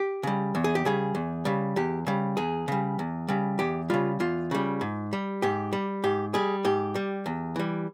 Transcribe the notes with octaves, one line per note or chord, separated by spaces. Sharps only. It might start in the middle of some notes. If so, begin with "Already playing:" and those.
Already playing: G4
C#3 G3
E2
G#4
G4
C#3 G3 G#4
E2
C#3 G3
E2 G4
C#3 G3
E2 G#4
C#3 G3
E2
C#3 G3
E2 G4
C#3 G3 F4
E2 F4
C#3 G3
G#2
G3
G#2 G4
G3
G#2 G4
G3 G#4
G#2 G4
G3
E2
E3 G3